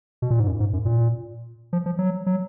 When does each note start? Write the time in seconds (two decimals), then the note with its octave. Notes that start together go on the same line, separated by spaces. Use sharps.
0.22 B2
0.30 A#2
0.40 G#2
0.47 F#2
0.60 G#2
0.73 F#2
0.85 A#2
1.73 F3
1.86 F3
1.99 F#3
2.26 F#3